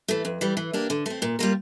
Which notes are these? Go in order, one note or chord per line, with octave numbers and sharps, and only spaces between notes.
E3 A3
F2
E3 G3
E3
A#3 D4 G4
D3
A3 C4
A#2
G3 A#3 F4 A#4